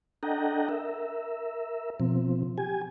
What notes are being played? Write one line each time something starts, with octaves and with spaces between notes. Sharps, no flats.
D4 A4 D#5 F#5 G5 A#5
A#4 E5
B2 F3 C4
G4 G#5